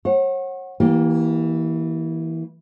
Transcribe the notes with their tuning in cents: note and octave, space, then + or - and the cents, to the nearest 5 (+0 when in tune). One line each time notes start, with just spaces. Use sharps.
C#5 -35 F#5 +0
E3 -20 A#3 +15 G4 -15